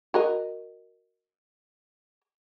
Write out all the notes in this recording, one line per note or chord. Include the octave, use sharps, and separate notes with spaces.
F#4 A#4 D#5